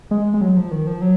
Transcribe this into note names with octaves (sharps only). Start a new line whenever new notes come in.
G#3
G#3
F#3
F3
D#3
F3
F#3